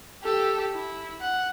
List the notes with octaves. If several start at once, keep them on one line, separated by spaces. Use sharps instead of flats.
G4 A4
E4
F#5